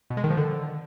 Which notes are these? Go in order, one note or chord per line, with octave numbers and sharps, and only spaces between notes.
B2
G#3
D#3
F3
D3